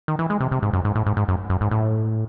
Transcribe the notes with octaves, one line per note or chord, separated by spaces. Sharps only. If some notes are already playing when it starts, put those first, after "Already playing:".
D#3
E3
G#3
C3
C3
G#2
F#2
G#2
A2
G#2
G#2
F#2
F#2
G#2
A2